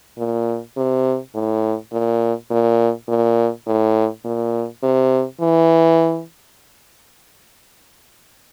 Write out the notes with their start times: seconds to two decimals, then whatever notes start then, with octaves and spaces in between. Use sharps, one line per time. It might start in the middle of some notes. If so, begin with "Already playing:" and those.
0.18 A#2
0.77 C3
1.34 A2
1.93 A#2
2.51 A#2
3.09 A#2
3.67 A2
4.25 A#2
4.83 C3
5.41 E3